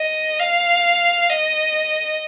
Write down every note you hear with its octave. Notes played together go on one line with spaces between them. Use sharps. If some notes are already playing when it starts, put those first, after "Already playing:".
Already playing: D#5
F5
D#5